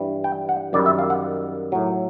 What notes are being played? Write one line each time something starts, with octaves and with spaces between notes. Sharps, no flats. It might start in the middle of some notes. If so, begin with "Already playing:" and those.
Already playing: G2 E3 G3
G5
F#5
F#2 D#3 G3 D5
E5
F5
F#5
A2 F#3